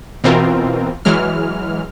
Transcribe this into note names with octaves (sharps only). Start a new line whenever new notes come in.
B2 E3 C4 F4 A#4
E3 F#3 G#3 F6